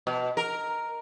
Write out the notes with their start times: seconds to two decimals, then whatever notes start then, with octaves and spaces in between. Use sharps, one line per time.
0.07 B2
0.37 A#4